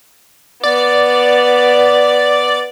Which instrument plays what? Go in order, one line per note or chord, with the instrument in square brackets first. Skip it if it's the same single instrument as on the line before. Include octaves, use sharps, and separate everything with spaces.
[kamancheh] B3 [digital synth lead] D5